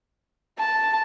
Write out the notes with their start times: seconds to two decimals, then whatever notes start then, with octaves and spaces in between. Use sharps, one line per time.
0.58 A5